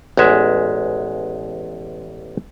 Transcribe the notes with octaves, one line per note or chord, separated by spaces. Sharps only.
A1 E2 G#3 E5